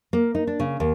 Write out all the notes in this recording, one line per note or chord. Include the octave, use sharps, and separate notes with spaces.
A#3
D#4
D4
C#3
D#2